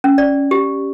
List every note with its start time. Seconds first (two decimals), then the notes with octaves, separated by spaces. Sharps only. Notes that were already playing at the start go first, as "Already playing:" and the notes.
0.04 C#4
0.18 D5
0.51 G4